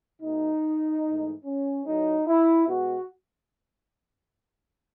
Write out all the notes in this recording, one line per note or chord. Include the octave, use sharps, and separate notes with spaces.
B2 A3 D#4
G#2 E3 A3
C#4
A2 F#3 A3 D#4
E4
B2 G#3 B3 F#4